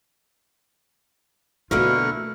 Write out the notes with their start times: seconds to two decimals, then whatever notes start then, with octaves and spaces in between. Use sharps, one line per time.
1.71 B2 D3 A3 A#3 E4 F4 A#4 C#6